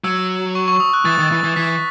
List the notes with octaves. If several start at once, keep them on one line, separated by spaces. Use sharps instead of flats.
F#3 E6
C#6
C#6
D#6
F#6
E3 A6
D#3
E3
E3
E3 B6